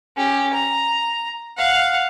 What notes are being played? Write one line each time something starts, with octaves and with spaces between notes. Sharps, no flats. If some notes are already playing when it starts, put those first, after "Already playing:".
C#4 G4
A#5
F5 F#5